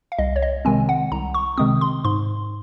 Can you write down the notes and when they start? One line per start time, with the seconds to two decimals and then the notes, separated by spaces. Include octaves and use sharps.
0.12 F5
0.18 C2 D#5
0.36 C#5
0.42 D#5
0.65 C3 D#3 G#3 C4 G#5
0.89 F#5
1.12 C2 A#5
1.34 C#6
1.57 C3 D#3 G#3 C4 D#6
1.81 C6
2.05 G#2 C6